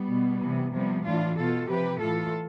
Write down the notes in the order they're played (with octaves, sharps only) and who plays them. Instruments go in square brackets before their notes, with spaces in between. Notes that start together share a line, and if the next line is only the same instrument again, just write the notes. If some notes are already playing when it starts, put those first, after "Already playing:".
Already playing: [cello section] G3 B3
B2
C3 E3
C3 F3 G3 B3
A2 E3 D4 F4
B2 F4 A4
C3 F3 G4 B4
A2 E3 F4 A4